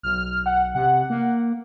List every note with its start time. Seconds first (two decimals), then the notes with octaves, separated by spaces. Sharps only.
0.03 B1 F6
0.46 F#5
0.75 C3 F#5
1.10 A#3